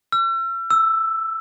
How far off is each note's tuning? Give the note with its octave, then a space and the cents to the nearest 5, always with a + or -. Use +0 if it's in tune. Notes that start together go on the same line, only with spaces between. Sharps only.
E6 +40
E6 +5